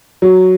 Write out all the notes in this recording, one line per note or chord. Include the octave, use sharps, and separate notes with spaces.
F#3